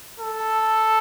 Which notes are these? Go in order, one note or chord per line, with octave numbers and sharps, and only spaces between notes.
A4